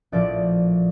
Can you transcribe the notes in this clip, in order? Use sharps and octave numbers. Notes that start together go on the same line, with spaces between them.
A#1 A2 F3 D5